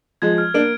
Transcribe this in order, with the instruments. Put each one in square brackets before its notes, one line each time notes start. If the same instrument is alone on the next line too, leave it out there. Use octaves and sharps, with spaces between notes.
[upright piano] F3 G#3 [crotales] G#6
[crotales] F6
[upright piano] A#3 D4 [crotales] D7